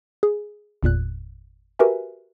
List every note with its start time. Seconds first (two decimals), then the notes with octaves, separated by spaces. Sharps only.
0.23 G#4
0.83 G1 E2 A#2 F#6
1.79 F#4 G4 A#4 B4 E5 G#5